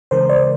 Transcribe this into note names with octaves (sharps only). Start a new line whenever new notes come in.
C#3 E3 G#3 A#4 C5
C5 D5